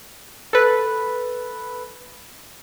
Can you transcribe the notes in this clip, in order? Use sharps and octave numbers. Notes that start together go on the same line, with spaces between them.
A4 B4